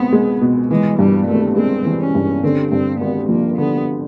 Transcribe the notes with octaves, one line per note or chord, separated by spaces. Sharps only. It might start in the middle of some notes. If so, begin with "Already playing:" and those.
Already playing: C#2 B2 B3 C4
G#3
B2
E3 G#3
G2 G3
G#1 A3
G#3 C4
E3
C#4
G2
D3 C4
G2 C4
G#1 B3
F3 A#3
D3 B3